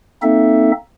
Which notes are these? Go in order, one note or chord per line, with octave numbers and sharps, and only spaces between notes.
A#3 C4 D#4 A4 E5